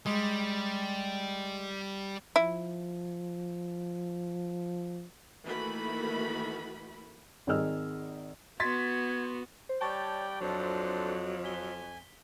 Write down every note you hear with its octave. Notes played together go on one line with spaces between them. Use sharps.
G3 G#3
F3 E4
D#3 E3 A3 A#3 F#4 B5
G#1 D#3 G#4 D#5 E6 F6
B3 F#4 C6 G#6 A6 B6
C5
G3 C#5 D5 G5 A5 C#6 A6
F2 F#3 D4 A4 C5
G#5 B6 G7